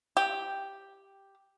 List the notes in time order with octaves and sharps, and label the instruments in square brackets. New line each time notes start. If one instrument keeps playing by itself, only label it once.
[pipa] G4